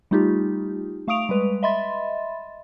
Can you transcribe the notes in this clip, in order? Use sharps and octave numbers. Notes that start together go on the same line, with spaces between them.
G3 A3 D#4 F4 G4
A3 F5 C#6 D#6 D7 F7
G3 G#3 B4
D#5 E5 B5 C6 A6